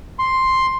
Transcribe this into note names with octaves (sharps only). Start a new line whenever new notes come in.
C6